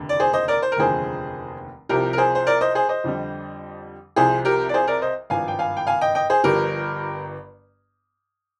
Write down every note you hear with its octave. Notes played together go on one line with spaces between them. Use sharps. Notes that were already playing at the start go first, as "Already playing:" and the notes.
Already playing: F1 D#2 D3
D5
G#4 C5
C5 D#5
A#4 D5
C5
A#4
F1 D#2 D3 F3 G#4 C5
C2 C3 F3 G4 A#4
A#4
G#4 C5
C5
A#4 D5
C5 D#5
G#4 C5
C5 D#5
F2 D3 G3
C2 C3 F3 G#4 C5
G4 A#4
D5
G#4 C5
A#4 D5
C5 D#5
G#1 G2 F3 F5 G#5
G5
F5 G#5
G5
F5 G#5
D#5 G5
D#5 G5
G#4 C5
G1 G2 F3 G4 A#4